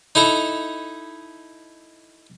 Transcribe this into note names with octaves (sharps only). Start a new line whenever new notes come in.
D#4 E4 A4 A#5